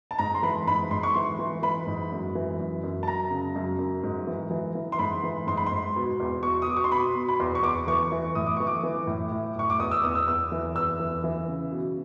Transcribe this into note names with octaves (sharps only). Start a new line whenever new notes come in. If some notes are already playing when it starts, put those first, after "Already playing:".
A5
G#2 A#5
C6
E3 B5
G#2 B5
G#2 C6
C#6
E3 C6
E3
E3 B5
G#2
F#2
E3
F#2
F#2
A5
F#2 A#5
C#3
F#2
F#2
G#2
E3
E3
E3
C6
G#2 B5
E3
G#2 C6
B5
C6
G#2
B2
E2
B2 C#6
D#6
B2 D6
C#6
C6
B2 B5
B2
B5
E2 C6
C#6
E2 D6
E3 C#6
E3
A2 D#6
D6
E3 C#6
D6
E3
A2
A2
A2 C#6
D6
E2 D#6
E6
E2 D#6
E6
E2 E6
E3
E2 E6
E3
E3
C#3
B2